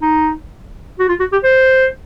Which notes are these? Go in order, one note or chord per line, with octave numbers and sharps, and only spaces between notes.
D#4
F#4
F4
F#4
G4
C5